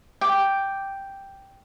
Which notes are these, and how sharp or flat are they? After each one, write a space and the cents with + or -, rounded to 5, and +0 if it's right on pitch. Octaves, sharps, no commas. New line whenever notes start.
G5 +0 D6 +0